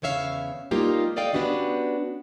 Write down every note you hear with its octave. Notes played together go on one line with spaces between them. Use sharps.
E2 C#3 C#5 E5 F5
G3 A#3 D#4 F4 G4
A4 D5 D#5 F5 G5
B3 C#4 D4 F#4 G4